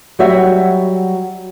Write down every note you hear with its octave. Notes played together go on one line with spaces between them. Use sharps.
F#3 G3 F#4 E5